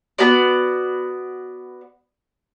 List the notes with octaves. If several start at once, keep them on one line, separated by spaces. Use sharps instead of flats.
B3 F#4 D5